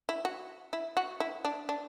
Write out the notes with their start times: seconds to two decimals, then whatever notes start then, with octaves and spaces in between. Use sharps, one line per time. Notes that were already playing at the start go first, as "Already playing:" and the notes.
0.09 E4
0.25 F#4
0.73 E4
0.97 F#4
1.20 E4
1.45 D4
1.69 D4